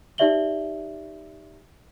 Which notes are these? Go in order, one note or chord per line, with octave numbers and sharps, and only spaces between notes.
D#4 G4 D5 E5 F#7 G7